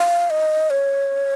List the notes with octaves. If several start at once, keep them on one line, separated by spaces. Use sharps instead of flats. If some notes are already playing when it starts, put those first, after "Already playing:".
Already playing: F5
D#5
C#5